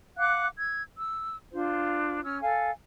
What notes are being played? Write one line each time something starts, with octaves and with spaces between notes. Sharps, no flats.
F5 F#5 D6 F#6
E6 G#6
E6
D4 F4 C5
C#4 E6 F6
A4 F5 G#5